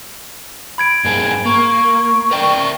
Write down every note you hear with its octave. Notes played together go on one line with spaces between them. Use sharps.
B5 G#6 D7
G2 A#3 G#4
A#3 C#6
A#4 D5 G5